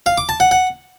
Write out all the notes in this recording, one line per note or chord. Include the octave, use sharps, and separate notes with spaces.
F5
D6
A5
F#5
F#5